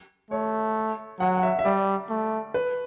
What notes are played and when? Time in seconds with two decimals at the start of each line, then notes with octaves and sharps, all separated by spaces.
0.31 A3 C#5
1.20 F#3 F#5
1.37 F#5
1.43 E5
1.59 E5
1.65 G3 D5
2.10 A3
2.54 B4